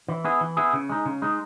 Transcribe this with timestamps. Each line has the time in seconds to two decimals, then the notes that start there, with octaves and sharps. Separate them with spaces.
0.08 E3
0.24 B3 E4 G#4
0.41 E3
0.57 B3 E4 G#4
0.73 C#3
0.90 G#3 D#4
1.06 C#3
1.22 G#3 D#4